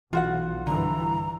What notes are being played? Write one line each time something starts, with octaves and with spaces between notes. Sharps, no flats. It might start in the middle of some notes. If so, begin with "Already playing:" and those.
B1 E3 F4 F#4 F#5
G2 D3 E3 A#5